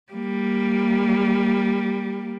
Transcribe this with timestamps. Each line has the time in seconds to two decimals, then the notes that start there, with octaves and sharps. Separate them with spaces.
0.12 G3 A#3